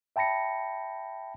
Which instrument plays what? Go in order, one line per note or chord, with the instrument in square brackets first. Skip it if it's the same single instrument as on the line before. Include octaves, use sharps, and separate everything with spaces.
[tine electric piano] E5 G5 A5 B5 A#6 C#7